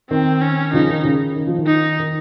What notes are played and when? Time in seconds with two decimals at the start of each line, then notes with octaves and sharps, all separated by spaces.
0.10 D#3 C4
0.42 C#4
0.73 C#3 F3 D#4
0.90 D#3
1.04 C#3
1.36 D#3
1.47 F3
1.58 D#3
1.67 D#4
1.99 D#3